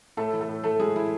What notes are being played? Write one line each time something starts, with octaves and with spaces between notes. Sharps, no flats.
A2 A3 A4
E3
A3 A4
A2
E3 A3 A4
A2 G#3 G#4
E3 E4